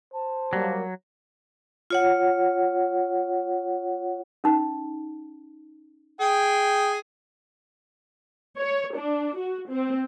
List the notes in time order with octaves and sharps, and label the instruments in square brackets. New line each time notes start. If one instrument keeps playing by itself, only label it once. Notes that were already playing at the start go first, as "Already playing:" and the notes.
[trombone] C5 [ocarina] A5
[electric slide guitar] F#3 [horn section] G3 A#3
[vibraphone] F4 C#5 F#5
[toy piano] C#4 D#4
[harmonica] G#4 G5
[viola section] C#5
D4
F#4
C4